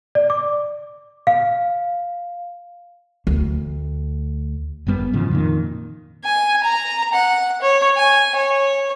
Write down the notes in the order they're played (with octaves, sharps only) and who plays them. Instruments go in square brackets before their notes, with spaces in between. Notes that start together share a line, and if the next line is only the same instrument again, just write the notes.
[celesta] D5
D6
F5
[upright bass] D2
[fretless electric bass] G1 F#2 G3 B3
G#2 C#3 E3 F3
F2 A#2 D#3
[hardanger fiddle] G#5
A#5
F#5
C#5
G#5
C#5